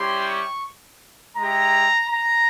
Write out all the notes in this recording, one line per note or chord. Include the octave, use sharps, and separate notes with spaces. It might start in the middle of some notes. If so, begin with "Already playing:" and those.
Already playing: G3 C#4 E4 G4 C6
C#6
G#3 E4 G4 A#5
A#5